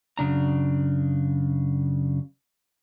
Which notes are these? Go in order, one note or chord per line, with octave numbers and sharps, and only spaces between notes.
F#2 C#3 D4 A#5